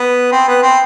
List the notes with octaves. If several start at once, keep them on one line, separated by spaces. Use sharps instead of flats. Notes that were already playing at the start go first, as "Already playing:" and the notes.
Already playing: B3
C4
B3
C4